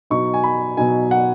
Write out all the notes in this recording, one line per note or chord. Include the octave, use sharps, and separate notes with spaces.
B2 F#3 D#4 C#6
G#5
B5
B2 F#3 D#4 G#5
F#5